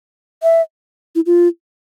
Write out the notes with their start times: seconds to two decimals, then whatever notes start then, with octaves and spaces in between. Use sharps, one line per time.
0.43 E5
1.15 E4
1.26 F4